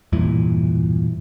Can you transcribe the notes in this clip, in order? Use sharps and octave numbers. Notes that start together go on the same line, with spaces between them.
E1 G2 A#2 E3